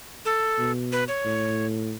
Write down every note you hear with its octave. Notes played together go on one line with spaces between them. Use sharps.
A4
B2
B4
C#5
A2